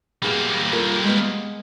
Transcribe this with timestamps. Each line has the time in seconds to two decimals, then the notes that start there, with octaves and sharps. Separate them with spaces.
0.22 B2 G3 A#3 G#4 G5
0.73 F4 A4 A#4
1.04 G#3 B3